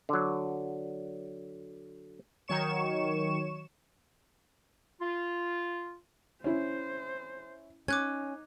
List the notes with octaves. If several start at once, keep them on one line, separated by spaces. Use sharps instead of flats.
D3 F#3
D#3 F#3 C#5 C#6 E7
F4
C#4 E4 C5
C#4 D#4 D6 F#6 G#6